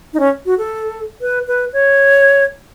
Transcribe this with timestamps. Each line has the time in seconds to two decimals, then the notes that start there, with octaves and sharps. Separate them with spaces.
0.13 D#4
0.20 C#4
0.45 F#4
0.58 A4
1.21 B4
1.47 B4
1.73 C#5